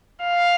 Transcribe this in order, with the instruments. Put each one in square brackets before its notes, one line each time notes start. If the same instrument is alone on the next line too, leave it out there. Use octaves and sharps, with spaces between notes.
[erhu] F5